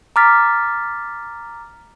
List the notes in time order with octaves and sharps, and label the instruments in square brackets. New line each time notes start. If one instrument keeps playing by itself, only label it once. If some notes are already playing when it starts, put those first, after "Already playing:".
[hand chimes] A#5 D6 F6 A6 B6